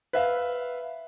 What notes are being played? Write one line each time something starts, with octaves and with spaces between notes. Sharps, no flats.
B4 E5 F5